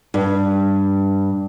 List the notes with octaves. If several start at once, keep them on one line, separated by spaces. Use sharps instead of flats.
G2